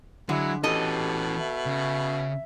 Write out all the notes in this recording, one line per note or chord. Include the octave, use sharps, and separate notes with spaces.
D3 F#3 G#3 E4
B2 E3 C#4 G4 A4 D#5
E5
C#3